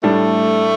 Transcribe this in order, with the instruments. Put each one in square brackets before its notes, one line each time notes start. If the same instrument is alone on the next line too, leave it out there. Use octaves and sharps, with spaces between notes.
[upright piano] A2 G3 D4 [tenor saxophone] A3